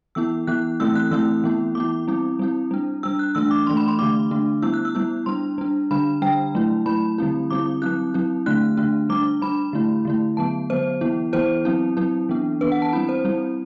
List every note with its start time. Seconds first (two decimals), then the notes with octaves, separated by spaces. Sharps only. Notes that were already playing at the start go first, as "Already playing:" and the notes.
0.15 E3 B3 E4 E6
0.47 E3 B3 E4 F#6
0.80 E3 A3 C4 E4 E6
0.96 F#6
1.11 E3 A3 C4 E4 E6
1.44 E3 B3 E4
1.75 E3 B3 E4 D6
2.08 G3 C4 E4
2.39 G3 C4 E4
2.71 G3 D4
3.03 G3 D4 E6
3.19 F#6
3.35 E3 A3 D4 E6
3.51 D6
3.66 E3 A3 D4 C6
3.77 B5
3.88 C6
3.99 D3 A3 D4 D6
4.31 D3 A3 D4
4.62 G3 B3 E4 E6
4.74 F#6
4.85 E6
4.95 G3 B3 E4
5.26 G3 D4 C6
5.58 G3 D4
5.91 D3 G3 D4 B5
6.22 D3 G3 D4 G5
6.55 F#3 A3 E4
6.86 F#3 A3 E4 B5
7.18 D3 G3 C4 E4
7.50 D3 G3 C4 E4 D6
7.82 F#3 C4 E4 F#6
8.14 F#3 C4 E4
8.46 D3 A3 D4 F#6
8.77 D3 A3 D4
9.09 G3 D4 D6
9.42 G3 D4 B5
9.73 D3 A3 E4
10.05 D3 A3 E4
10.37 D3 F#3 B3 A5
10.70 D3 F#3 B3 C5
11.01 E3 B3 E4
11.33 E3 B3 E4 C5
11.65 F#3 C4 E4
11.97 F#3 C4 E4
12.29 E3 B3 D4
12.61 E3 B3 D4 B4
12.72 F#5
12.82 A5
12.93 G3 C4 E4 B5
13.09 C5
13.25 G3 C4 E4